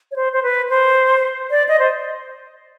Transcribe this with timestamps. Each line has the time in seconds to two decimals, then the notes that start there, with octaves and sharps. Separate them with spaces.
0.11 C#5
0.16 C5
0.33 C5
0.43 B4
0.70 C5
1.51 D5
1.69 D#5
1.79 C5